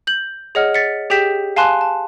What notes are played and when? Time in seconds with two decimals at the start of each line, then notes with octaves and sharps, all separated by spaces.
0.07 G6 F#7
0.55 G#4 C#5 D#5 F#5 F6
0.74 A6 B6 C#7
1.10 G4 G#4 G5 G6 B6 E7
1.56 F5 G#5 A5 C6 F#6
1.81 A5